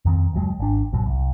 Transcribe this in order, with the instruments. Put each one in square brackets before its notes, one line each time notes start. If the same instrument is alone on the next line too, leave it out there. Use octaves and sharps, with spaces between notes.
[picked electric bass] F2 D#3 C4
F#1 D#2 F#3 G#3
G#1 D4
G#1 D#2 B2 F#3
C2